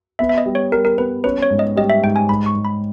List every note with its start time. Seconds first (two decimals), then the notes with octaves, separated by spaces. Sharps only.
0.19 B3 E5
0.29 E5
0.38 D#5
0.46 G3
0.55 C#5
0.72 G3 A#4
0.85 A#4
0.98 B3 B4
1.24 C#4 B4
1.42 C#5
1.50 G#2
1.59 D#5
1.76 G3 D#5
1.90 E5
2.03 G#2 G5
2.16 G#5
2.29 G#2 B5
2.46 C#6
2.55 G#2
2.65 B5